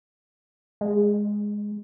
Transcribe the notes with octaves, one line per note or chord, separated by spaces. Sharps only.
G#3